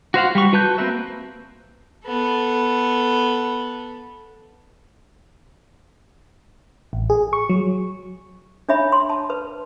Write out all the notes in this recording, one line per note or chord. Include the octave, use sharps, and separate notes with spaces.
F#4 C5 F5 F#5
G3 C#6
F#4 B4 A5 F#6 G6
A#3 C4 A#4 B4 E5
B3 A4
A1
G#4
C#6
F#3
D4 C#5 E5 B5
C6
A5
B4